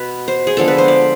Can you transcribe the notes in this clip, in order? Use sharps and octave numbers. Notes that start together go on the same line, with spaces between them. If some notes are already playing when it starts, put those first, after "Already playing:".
Already playing: B2 B4
C5
G#4
D3 F3 G#3 B3 A4
B4
C5
D5